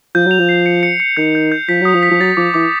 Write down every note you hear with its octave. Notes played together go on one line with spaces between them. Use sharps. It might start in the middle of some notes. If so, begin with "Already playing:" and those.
F3 G6
F#3 F7
F3
C7
C#7
C#7
C#7
D#3 G6
G6
G6
F3 B6
F#3 D#6
F3
B6
F3
F#3 A6
F3 D6
E3 D6